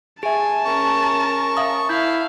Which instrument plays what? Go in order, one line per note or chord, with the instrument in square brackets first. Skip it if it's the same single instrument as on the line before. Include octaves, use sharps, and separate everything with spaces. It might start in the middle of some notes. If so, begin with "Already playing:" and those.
[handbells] G#4 E5 [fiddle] G#5 [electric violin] A5
[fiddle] C#4 A#4 [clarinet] C#6
[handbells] E5 F5 D#6
[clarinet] E4 [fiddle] E5 F5 [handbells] G6